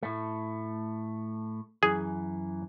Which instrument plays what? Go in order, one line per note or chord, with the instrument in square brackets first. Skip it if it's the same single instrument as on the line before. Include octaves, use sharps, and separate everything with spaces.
[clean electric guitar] A2 A3
[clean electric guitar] F#2 E3 [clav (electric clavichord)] G#4